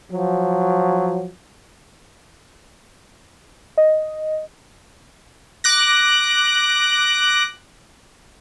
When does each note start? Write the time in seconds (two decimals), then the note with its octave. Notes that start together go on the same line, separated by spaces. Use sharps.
0.11 F3 F#3
3.78 D#5
5.64 D6 F#6 A#6